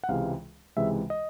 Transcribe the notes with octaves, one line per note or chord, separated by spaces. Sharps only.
F#5
C#2 C3 E3 G#3 F5
C#2 C3 E3 G#3 E5
D#5